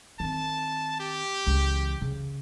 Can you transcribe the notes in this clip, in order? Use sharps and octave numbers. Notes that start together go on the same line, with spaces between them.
D#3 C4 A5
G4
C#2 E3
C#3